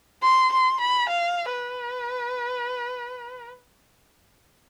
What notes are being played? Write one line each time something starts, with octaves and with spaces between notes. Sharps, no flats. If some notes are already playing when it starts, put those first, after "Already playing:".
C6
C6
B5
F5
B4